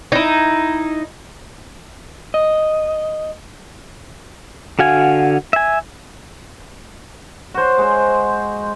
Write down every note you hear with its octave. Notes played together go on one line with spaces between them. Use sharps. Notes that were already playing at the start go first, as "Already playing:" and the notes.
D#4 E4
D#5
D3 F#4 F5 G#5
E5 G#5
F#4 C5
G#3 C5